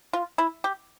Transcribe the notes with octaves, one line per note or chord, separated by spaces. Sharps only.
F4
E4
G4